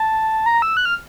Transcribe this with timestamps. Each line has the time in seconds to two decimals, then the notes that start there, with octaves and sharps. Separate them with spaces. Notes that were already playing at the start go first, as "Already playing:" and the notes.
Already playing: A5
0.46 A#5
0.62 E6
0.77 F#6
0.85 F6